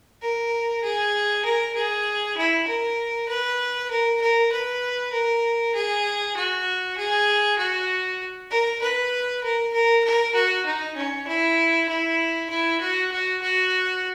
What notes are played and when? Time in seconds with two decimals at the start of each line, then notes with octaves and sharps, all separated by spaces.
0.22 A#4
0.83 G#4
1.45 A#4
1.75 G#4
2.37 E4
2.68 A#4
3.28 B4
3.91 A#4
4.21 A#4
4.52 B4
5.12 A#4
5.75 G#4
6.36 F#4
6.97 G#4
7.58 F#4
8.50 A#4
8.81 B4
9.43 A#4
9.73 A#4
10.04 A#4
10.35 F#4
10.65 D#4
10.96 C#4
11.27 E4
11.89 E4
12.50 E4
12.80 F#4
13.12 F#4
13.42 F#4